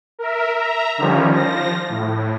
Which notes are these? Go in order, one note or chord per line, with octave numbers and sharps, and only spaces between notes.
A#4 E5
E5 A#5
D3 D#3 F3 G3 C#4
F3 A#6
A2